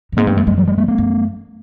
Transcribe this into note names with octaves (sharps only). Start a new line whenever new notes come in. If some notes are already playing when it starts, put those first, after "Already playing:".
G2
G#2 A#3 C4
G2 A3 B3
F#2 G#3 A#3
F#2 G3 A3
F#3 G#3
G3 A3
G#3 A#3
A3 B3
F#2